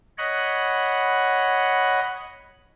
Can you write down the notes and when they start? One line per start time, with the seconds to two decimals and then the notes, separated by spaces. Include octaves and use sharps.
0.18 C#5 D#5 F#5 B5